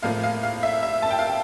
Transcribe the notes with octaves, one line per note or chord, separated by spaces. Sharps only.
A2 F3 A#3 F5
F5
F5
E5
E5
A5
G5
F5
G5